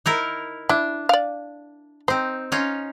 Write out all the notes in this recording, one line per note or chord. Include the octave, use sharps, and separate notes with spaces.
D#4 E4 A#4
D4 E4
D5 F5
C4 D#4 C5
C#4 D#4 F4